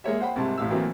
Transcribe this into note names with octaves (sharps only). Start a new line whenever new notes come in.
G#3 A#3 C#5 E5
C5 F#5 G5 B5
C2 G#2 C3 A5
A1 A2 F5 E6
E3 F#3 A3 A#3 C4